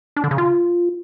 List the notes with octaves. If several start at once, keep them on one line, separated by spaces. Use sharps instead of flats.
D4
D3
C#3
F4